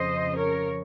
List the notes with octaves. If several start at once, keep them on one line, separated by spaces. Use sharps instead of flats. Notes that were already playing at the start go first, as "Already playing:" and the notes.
Already playing: F2 C#3 F3 C5 D#5
A#4 C#5